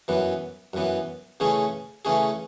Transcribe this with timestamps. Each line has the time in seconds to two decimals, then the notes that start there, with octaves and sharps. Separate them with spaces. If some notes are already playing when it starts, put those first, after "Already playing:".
0.08 F#2 E3 B3
0.73 F#2 E3 B3
1.40 C#3 E3 A3 C#4 G#4
2.05 C#3 E3 A3 C#4 G#4